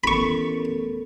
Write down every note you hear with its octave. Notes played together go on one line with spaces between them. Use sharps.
A1 B3 A4 A#4 B5 C#6